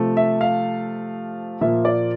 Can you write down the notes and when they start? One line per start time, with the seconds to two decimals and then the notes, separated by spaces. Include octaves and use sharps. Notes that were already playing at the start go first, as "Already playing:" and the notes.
Already playing: C3 F3 A3
0.17 E5
0.41 F5
1.61 A#2 F3 A#3 E5
1.85 D5